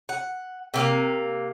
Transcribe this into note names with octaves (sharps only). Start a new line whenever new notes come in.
F#5
C3 A#3 F5